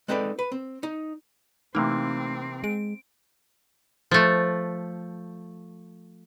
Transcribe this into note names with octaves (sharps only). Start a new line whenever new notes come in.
G#3 C4 D#4 A4 B4 D5
B4
C4
D#4
C3 E3 A3 A#3 C4 D#4
G#3 D7
F3 A3